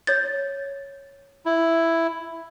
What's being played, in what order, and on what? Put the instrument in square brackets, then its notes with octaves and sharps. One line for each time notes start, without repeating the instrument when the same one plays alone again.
[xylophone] C#5 G6 A6
[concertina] E4